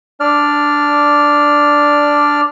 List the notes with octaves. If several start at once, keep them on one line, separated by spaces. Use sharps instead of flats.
D4 D5 F6